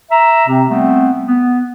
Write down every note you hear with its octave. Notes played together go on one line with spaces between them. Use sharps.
E5 A#5
C3 C4
G3 A3 B3 C4
B3